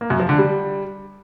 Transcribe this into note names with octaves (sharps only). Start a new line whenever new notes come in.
A#3
F#2
F3
D3
G3